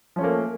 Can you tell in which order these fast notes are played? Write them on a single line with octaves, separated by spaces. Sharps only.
F3 C#4 A3 A#3